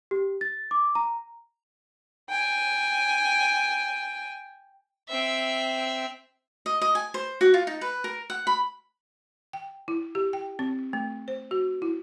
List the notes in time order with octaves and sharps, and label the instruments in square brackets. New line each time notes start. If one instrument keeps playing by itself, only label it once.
[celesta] G4
A6
D6
A#5
[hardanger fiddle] G5 G#5
C4 E5
[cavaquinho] D#5
D#5
G#5
C5
F#4
F4
D#4
B4
A#4
F#5
B5
[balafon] G5
E4
G4
G5
C4
A3
C5
F#4
E4